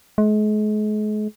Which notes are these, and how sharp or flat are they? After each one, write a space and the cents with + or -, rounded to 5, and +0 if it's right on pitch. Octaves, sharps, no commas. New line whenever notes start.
G#3 +40